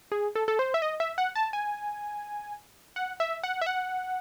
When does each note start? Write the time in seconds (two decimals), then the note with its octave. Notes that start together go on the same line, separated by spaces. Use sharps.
0.12 G#4
0.35 A4
0.48 A4
0.59 C5
0.74 E5
0.82 D#5
1.00 E5
1.18 F#5
1.35 A5
1.53 G#5
2.96 F#5
3.20 E5
3.43 F#5
3.61 E5
3.66 F#5